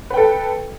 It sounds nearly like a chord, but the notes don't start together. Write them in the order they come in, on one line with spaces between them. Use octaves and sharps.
B4 G5 A4